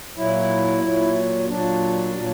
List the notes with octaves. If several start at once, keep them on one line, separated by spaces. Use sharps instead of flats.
A#2 F#3 E4
A#2 F#3
A#2 F#3 D4
A#2 F#3